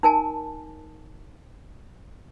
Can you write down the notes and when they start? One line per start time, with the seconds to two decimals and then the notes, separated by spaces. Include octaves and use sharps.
0.03 D#4 A#4 G#5 A5